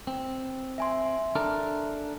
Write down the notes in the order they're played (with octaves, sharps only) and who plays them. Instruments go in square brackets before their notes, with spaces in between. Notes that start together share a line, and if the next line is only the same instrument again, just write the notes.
[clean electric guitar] C4
[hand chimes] E5 G#5 C6
[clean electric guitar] D4 A4 A#4